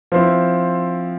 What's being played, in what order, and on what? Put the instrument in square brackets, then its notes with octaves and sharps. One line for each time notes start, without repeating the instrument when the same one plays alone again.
[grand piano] F3 C4 E4